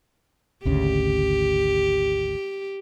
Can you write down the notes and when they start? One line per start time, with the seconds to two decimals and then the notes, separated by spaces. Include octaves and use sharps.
0.65 G#1 D2 C#3 G4